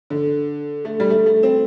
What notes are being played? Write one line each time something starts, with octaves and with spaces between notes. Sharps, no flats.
D3
A3
G3
A3
A3
C4